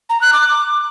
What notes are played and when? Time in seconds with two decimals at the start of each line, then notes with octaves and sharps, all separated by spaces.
0.10 A#5
0.21 F#6
0.33 D6